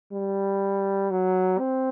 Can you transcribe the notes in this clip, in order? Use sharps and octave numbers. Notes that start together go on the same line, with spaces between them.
G3
F#3
C4